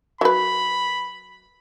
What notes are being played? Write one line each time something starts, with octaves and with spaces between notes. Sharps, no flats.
F#3 B4 B5